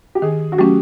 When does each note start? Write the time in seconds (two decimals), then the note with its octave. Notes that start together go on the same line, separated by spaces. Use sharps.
0.15 G4
0.22 D#3 G#4
0.52 F#4
0.58 F#3 A3 C#4 G4